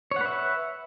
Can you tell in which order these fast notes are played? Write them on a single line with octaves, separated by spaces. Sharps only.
C#5 F#5 B4 E5